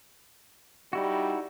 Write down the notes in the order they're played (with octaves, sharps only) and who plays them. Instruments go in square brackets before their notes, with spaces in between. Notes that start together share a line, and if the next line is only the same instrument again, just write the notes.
[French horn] G3 [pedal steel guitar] D#4 E4 F#4